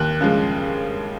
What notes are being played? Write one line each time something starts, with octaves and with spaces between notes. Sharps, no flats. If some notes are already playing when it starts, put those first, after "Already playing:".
Already playing: D#2 F#6
C#3 F3 G#3